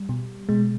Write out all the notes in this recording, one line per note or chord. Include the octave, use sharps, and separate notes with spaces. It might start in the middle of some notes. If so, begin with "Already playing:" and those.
Already playing: G3
B2
B2 G#3